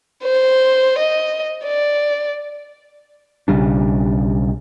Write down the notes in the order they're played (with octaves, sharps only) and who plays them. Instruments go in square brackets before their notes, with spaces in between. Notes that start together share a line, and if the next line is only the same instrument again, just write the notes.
[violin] C5
D#5
D5
[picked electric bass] B1 C#3 G3 D4